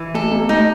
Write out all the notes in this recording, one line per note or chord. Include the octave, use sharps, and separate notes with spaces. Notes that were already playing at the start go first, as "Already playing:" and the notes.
Already playing: E3
A3 A4
B3
A3 D#4